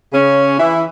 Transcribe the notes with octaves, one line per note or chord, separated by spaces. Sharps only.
C#3 C#4
E3 E4